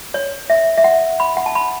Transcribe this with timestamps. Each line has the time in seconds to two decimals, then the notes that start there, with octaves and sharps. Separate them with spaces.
0.14 C#5
0.50 E5
0.77 E5
0.84 F#5
1.20 B5
1.37 F#5
1.46 A5
1.55 B5